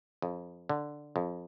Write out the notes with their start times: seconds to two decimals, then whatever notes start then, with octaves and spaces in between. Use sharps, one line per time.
0.22 F2
0.69 D3
1.16 F2